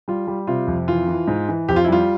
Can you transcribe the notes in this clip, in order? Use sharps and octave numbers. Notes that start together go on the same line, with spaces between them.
G3 F4
G3
C3 F4
F2
E3 F4
E3
G#2
E3
F2 G4
F4
E4
G3 F4